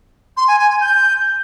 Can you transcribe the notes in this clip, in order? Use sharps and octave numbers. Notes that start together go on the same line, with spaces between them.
C6
G#5
G#5
G#5
G6